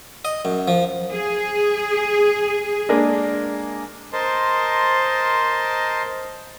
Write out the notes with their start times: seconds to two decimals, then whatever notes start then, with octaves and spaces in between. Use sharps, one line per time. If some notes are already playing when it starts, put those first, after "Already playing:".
0.25 D#5
0.45 F#2
0.68 F3
1.11 G#4
2.89 G#3 A#3 D4
4.13 A#4 C5 D#5 A5 C6